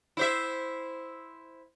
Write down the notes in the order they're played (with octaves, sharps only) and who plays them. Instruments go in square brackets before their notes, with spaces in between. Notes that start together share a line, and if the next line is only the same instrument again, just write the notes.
[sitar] E4 C5 E5